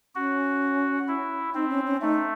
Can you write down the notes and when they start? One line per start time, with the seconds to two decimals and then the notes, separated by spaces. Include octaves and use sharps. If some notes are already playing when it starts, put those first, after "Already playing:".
0.15 C#4 F#4
1.08 E4
1.54 C4 D#4
1.70 C#4
1.86 C#4
2.01 A3 D#4